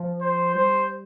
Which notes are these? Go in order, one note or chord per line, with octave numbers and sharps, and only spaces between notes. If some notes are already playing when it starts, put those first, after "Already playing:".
Already playing: F3
C5
G3 C5